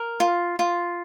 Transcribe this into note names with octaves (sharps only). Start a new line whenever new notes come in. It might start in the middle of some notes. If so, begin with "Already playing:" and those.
Already playing: A#4
F4
F4